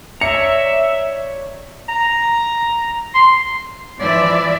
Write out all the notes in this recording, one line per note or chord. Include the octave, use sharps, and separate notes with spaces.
C#5 D5 E5 A#5 C#7
A#5
C6
E3 F3 D5 E5